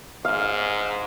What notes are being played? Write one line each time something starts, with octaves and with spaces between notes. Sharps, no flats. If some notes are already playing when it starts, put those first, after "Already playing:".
G#2 F5